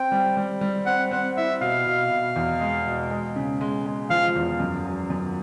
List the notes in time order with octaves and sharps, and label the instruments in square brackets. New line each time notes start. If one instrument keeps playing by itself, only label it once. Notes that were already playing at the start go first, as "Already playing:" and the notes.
Already playing: [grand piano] C4 [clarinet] G5
[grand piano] G3
G3
G3
[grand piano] C4 [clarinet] F#5
[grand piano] C4 [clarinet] F#5
[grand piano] E4 [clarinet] E5
[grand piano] B2 [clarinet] F5
[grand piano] B2
B2
E2
G#3
B2
G#3
C#3
G#3
G#3
[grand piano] F3 [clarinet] F5
[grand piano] E2
F#2
F#3
F#2